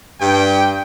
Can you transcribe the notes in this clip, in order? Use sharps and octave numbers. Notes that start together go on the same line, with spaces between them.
G2 G5